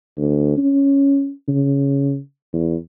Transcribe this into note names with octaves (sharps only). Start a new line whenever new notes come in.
D2
C#4
C#3
E2